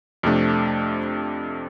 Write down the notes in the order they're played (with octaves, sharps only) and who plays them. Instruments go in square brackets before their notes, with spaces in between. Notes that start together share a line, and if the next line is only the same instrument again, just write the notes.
[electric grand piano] F2 C3 A3 D4